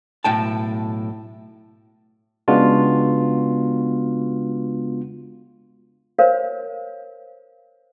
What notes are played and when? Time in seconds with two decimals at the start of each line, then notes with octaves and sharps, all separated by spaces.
0.24 B1 A2 G5 A5
2.48 C#3 G#3 B3 D4 F4 F#4
6.19 A#4 C5 C#5 F5